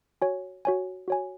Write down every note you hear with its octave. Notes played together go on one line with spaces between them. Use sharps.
F#4 C#5 G#5
F#4 C#5 G#5
F#4 C#5 G#5